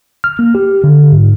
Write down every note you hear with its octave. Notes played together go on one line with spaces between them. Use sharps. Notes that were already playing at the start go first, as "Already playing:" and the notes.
F6
A#3
G4
D3
G#2